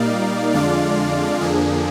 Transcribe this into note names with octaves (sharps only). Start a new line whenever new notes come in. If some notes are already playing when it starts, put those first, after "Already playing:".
Already playing: A#2 G3 A#3 D#4 D5 F5
F2 D3 G#3 D4 F4 D5 F5
F2 D3 F3 A#3 D4 G#4